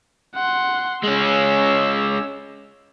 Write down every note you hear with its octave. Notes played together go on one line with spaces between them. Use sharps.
F#5 C6
G#3 C#4 C#5 E6